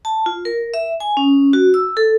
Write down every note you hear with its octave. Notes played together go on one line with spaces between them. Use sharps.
A5
F4
A#4
E5
G#5
C#4
F#4
E6
A4